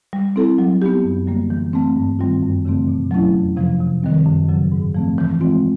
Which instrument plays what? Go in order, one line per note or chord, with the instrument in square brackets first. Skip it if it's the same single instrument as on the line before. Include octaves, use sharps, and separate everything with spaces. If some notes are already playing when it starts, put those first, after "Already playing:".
[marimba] G3
C4 E4 A4
F#3
B3 D#4 G4
F#2
D3 G3 A#3
E3
A3 C4
G2
D#3 G3 C4 F4
F#2
C#3 E3 A3 C4
B2
F#3 A3 C#4 E4
F2
C3 F3
C3
D#3 G3 C4
F#2
C#3 F#3
G#2
F3 A3 C4
E3
G#3 C4 F4